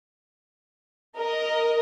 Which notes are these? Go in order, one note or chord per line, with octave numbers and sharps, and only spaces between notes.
A#4 D#5